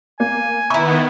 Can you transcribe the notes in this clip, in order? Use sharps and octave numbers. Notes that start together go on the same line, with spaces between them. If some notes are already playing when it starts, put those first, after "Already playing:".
A#3 G#5
D#3 B3 E4 E5 A#5 B5 C#6